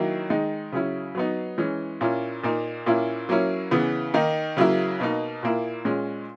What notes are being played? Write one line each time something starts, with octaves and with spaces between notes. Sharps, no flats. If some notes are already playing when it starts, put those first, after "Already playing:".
Already playing: D#3 F#3 A#3 E4
D#3 G#3 D#4
C#3 F#3 C#4 E4
F#3 B3 D#4
E3 G#3 C#4
A#2 A#3 C#4 E4
A#2 A#3 D#4
A#2 A#3 C#4 E4
F#3 A#3 C#4 E4
C#3 E3 B3
D#3 A#3 D#4
C#3 F#3 A#3 E4
B2 A#3 D#4
A#2 A#3 E4
A#2 G#3 C#4